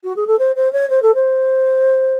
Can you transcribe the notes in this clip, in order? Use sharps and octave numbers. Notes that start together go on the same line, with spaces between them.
F#4
G#4
A4
C5
C5
C#5
C5
A4
C5